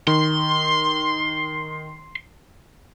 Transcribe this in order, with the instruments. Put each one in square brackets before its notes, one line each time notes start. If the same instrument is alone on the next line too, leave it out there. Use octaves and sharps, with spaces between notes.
[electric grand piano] D#3 [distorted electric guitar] C6